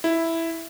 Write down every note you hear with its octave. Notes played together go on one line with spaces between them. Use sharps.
E4